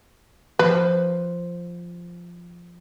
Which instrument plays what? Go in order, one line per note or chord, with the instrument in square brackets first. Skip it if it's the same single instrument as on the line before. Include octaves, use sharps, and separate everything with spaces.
[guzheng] F3 [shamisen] B4